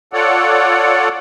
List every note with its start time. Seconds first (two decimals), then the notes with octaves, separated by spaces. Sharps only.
0.13 F4 A4 C#5 D5 F#5